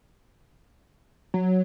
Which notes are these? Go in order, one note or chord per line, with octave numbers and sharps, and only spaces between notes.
F#3